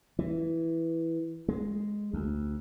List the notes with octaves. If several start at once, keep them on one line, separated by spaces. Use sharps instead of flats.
E3
G#3
D2